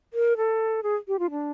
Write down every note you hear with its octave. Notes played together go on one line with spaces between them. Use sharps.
A#4
A4
G#4
G4
F4
D4